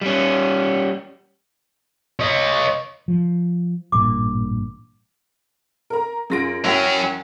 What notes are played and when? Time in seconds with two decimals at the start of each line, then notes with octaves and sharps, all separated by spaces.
0.01 G3 C#4
2.20 C#5 D#5
3.08 F3
3.92 A1 G2 A#2 D6
5.90 A#4 A#5
6.30 F#2 F4 G#4 A#6 D7
6.64 F#2 F#3 C#4 E4 F#5 G5